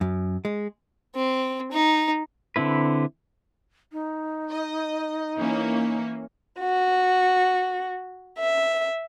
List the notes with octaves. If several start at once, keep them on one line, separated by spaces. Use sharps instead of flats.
F#2
G#3
C4
D#4
D3 C4 E4 B4
D#4
D#5
E3 A#3 C#4
F#4
E5